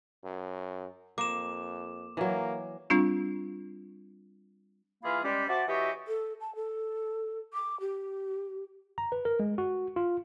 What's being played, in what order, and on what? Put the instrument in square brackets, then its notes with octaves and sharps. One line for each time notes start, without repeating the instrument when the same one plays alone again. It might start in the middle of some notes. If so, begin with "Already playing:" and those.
[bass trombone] F#2
[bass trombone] F2 [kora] A#3 [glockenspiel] D6 E7
[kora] E3 F#3 [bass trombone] A#3
[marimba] G3 C4 D4 F4
[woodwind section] E3 A#3 F4 G#4 F5 B5
G3 G#3 C#4 G4 D5
F#4 C5 E5 A5 D6
E3 F#4 G4 C#5 D#5 E5
[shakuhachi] A4
A5
A4
D6
G4
[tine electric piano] A#5
B4
A#4
G#3
F#4
F4